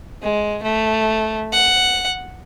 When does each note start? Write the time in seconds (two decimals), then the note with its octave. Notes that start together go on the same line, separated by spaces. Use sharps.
0.22 G#3
0.63 A3
1.53 F#5